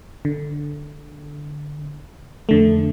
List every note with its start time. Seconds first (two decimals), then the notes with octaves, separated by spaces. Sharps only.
0.25 D3
2.49 F2 D3 A3